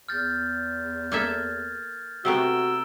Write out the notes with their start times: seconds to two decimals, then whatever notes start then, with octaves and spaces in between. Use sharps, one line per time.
0.09 E2 F6 G6 A6
1.12 A#3 A4 E5 F6 G#6 A6
2.25 C3 A3 B3 F#4 A#5 E6 D7 G7